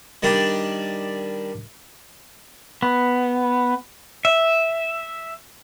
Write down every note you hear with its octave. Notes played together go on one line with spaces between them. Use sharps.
D#3 G3 D4 G4 D5
B3
E5